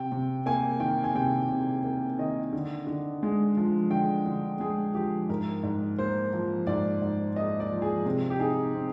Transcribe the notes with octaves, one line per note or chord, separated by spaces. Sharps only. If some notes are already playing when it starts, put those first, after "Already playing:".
Already playing: C3 G5
C3
A#3 G#5
D#3 G5
G#5
C3 G5
C3
A#3
D#3 D#5
D3
D3
G#3
F3
D3 G5
D3
G#3 G#4
F3 G4
G#2 A#4
G#2
A#3 C5
F3
G#2 D5
G#2
A#3 D#5
D5
F3
G#4
C3
G4
D#4 G#4
C4